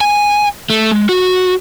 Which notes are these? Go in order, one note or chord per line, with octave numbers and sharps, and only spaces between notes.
G#5
A3
G#3
F#4